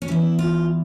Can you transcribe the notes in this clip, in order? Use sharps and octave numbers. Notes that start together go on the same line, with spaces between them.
C#4
E2 E3 E4
F4